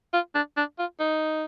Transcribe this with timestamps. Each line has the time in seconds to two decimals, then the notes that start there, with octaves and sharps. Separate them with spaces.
0.13 F4
0.35 D4
0.57 D4
0.79 F4
1.00 D#4